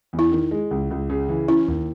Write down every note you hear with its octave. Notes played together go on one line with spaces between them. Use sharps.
E2
E4
D#3
G#3
C#2
C#2
C#3
E3
C#4 E4
D#2